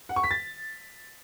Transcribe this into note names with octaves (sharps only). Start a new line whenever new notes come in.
F#5
C#6
B6
A6